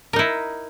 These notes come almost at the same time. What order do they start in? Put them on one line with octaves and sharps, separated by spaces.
A#4 D#4 E4